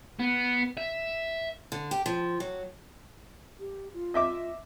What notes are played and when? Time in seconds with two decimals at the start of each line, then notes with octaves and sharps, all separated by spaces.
0.19 B3
0.77 E5
1.72 D3
1.91 G4
2.06 F3
2.40 F#3
3.59 G4
3.94 F4
4.14 D#5 E5 D6